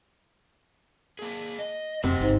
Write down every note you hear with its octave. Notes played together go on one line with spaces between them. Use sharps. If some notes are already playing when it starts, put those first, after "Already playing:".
A#3 G#4
D#5
F1 C3 C5 D#5 F#5
G1 G#2